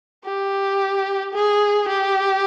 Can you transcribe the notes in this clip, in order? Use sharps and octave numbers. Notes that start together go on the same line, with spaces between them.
G4
G#4
G4